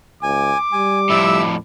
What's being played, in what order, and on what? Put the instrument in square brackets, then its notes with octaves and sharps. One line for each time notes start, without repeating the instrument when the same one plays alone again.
[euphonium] C#2 [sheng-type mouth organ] G#5 [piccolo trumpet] D6
[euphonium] G3 [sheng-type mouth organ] G#5
[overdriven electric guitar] F2 A2 [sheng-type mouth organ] E5 E6